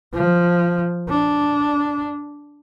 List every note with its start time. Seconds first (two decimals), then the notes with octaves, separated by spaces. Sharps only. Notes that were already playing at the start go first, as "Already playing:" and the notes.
0.13 F3
1.09 D4